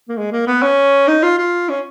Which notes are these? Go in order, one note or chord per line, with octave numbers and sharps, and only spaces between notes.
A#3
G#3
A#3
B3
C#4
D#4
F4
F4
C#4